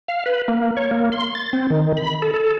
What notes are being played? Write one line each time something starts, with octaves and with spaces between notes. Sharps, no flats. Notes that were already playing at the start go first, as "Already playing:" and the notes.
F5
B4
A#3
C#5
A#3
C6
A6
C4
D#3
B5
A4
A4